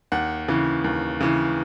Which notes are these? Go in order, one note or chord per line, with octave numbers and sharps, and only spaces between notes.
D#2 F#5
C#3 E3
D#2
C#3 E3